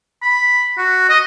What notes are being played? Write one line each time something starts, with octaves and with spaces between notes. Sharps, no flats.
B5
F#4
D#5